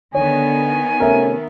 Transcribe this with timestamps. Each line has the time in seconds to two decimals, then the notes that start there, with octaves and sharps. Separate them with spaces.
0.15 D3 D#3 B3 C#5 G#5
1.00 C3 A3 C#4 A#4 E5